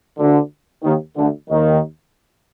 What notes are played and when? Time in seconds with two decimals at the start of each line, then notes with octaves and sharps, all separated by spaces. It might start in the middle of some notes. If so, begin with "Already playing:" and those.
0.18 D2 D3
0.83 D#2 D#3
1.16 D2 D3
1.49 D#2 D#3